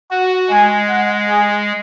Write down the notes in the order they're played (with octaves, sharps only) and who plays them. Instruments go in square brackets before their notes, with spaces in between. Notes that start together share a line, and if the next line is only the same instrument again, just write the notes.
[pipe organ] F#4 [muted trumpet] F#5
[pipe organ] G#3 [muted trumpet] G#5
[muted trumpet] F#5
G#4